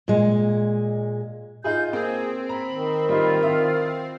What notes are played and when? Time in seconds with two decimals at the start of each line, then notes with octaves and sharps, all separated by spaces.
0.08 A#2 G#3
1.64 D#4 F4 G#4 G6
1.93 A#3 C4 G#4
2.49 A#5 B5
2.71 D#3
3.09 G3 D#4 F4
3.42 E4 E5